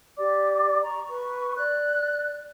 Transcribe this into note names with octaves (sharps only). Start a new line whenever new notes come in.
G4 D5 D6
A#5 C#6
B4 C#6
D5 F#6